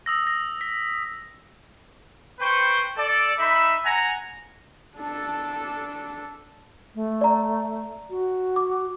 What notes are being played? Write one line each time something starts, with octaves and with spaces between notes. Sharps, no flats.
D#6 E6 A#6
A#6
B6
B4 C5 G5 C#6
A4 D5
D#4 E5 B5
F#5 G#5 A#5
D4 A4
A3
D5 A#5
F#4
D6